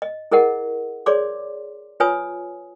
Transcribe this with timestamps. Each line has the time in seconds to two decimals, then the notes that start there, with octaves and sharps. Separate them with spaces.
0.02 D#5
0.31 E4 G#4 A#4 D#5 F#5
1.06 G#4 C#5 D5 C6 D6
2.00 F4 B4 C#5 G#5 D#6